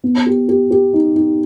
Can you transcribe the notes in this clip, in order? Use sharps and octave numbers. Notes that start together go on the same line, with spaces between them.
B3
G4
G4
G4
D#4
D#4